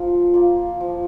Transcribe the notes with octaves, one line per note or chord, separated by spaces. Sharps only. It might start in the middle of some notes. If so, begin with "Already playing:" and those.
Already playing: F3 A#3 F4
A#3 F4
F3